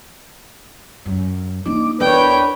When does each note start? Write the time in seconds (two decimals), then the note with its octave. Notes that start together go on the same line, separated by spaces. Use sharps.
1.06 F#2
1.66 A#3 D4 D#4 D6
2.00 E2 D4 A#4 B4 C#5 D5 G5